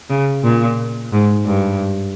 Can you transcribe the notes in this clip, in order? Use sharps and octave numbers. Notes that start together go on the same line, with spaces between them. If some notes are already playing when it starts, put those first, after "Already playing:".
C#3
A#2
G#2
G2